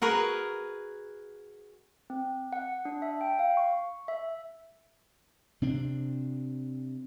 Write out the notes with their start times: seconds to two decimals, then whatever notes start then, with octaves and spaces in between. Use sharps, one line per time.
0.02 F#4 G#4 A#4 B4
2.10 C4
2.53 F#5
2.85 D4
3.02 E5
3.21 G5
3.39 F5
3.57 C#6
4.08 E5
5.62 C3 C4 D4